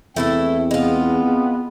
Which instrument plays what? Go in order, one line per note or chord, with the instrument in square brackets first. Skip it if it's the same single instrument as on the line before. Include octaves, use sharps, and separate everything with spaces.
[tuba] E2 [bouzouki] A3 E4 A4 [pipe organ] C4
[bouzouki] G#3 F4 [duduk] B3